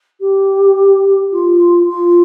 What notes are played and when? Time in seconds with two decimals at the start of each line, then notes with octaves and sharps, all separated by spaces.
0.21 G4
1.32 F4
1.89 F4